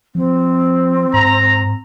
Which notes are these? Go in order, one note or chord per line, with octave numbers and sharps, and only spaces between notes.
F3 C4
G#2 A#5